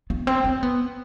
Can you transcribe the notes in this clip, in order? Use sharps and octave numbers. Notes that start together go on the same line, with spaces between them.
B3
C4
C4
B3